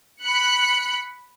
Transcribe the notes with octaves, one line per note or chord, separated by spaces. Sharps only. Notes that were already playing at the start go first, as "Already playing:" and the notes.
B5 F#6 C#7